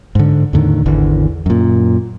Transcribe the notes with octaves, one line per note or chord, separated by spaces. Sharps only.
G#2 D3
E2 A2 D3 D#3
G#1 E2 D3 E3
F#2 A#2